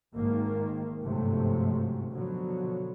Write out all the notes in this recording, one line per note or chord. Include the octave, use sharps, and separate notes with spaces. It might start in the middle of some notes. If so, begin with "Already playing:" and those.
G#1 G#2 D#3 A#3
G1 G#2 C3 F3 F#3 A3
B2 D3 F3 F#3